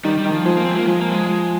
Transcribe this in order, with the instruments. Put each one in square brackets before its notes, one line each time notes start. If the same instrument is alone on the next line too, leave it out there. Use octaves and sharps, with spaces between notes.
[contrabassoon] D#3 [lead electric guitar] G3
[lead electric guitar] G3
[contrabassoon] D#3
[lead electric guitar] F3
[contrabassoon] F3 [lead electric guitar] G#3
[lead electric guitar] A#3
C4
G#3
A#3
[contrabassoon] F3 [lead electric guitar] G#3
[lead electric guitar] A#3
G3
G#3
G#3